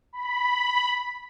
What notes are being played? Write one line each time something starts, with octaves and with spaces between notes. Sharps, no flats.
B5